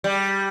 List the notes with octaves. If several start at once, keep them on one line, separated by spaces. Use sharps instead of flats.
G3